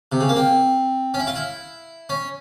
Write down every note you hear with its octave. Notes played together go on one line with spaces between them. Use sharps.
C3
C#3
A#3
C4
C#4
E4
F4
E4
C#4